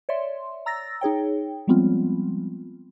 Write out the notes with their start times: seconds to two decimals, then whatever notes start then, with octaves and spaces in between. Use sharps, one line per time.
0.09 C#5 D5 E5 C6
0.66 A#5 E6 A6 A#6
1.01 D#4 G#4 C#5 G5
1.68 F3 G3 G#3 B3 C4 F4